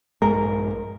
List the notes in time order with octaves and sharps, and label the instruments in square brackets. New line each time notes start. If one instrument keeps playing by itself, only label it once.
[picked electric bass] A#1 G2 G#3 [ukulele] A#4